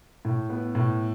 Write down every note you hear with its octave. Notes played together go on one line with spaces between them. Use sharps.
A2
B3
A2